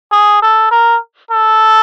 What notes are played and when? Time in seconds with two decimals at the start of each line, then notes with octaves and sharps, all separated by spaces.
0.11 G#4
0.42 A4
0.71 A#4
1.31 A4